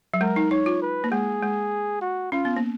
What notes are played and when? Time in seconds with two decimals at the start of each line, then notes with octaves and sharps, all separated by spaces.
0.14 F#3
0.21 G#3 A#4
0.36 D#4
0.51 D#4 C#5
0.66 F4
0.82 B4
1.04 A#3
1.11 G#3 G#4
1.42 G#3
2.02 F#4
2.32 C#4 F4
2.45 B3
2.57 A#3